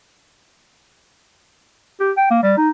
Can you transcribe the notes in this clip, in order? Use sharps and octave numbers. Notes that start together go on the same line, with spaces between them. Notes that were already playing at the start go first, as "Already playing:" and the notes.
G4
G5
A#3
G3
D#4